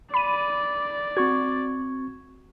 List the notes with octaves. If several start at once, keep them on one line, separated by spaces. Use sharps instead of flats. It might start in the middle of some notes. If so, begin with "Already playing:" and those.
D5 B5 D#7
C4 F#4 C#6 G#6